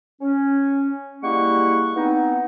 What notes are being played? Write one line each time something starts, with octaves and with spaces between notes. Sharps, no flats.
C#4
G3 G#3 A#3 E4 F#5 C#6
B3 C4 D#4